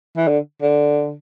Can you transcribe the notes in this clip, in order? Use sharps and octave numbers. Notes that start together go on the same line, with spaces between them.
E3
D3
D3